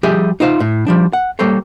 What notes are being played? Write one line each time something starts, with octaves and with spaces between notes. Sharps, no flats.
F3 G3 G4 G#4 E5
D#4 F4 C5 F5
A2
F3 G3 D4
F#5
G3 A#3 A4 C5 C#5